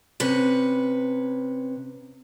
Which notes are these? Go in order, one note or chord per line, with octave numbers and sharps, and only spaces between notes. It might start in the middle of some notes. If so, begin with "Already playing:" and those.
C3 C#4 B4